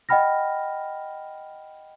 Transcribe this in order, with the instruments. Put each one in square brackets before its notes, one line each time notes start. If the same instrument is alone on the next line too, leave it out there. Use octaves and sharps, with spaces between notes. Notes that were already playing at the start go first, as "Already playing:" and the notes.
[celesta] D#5 F#5 G5 B5 F6 A#6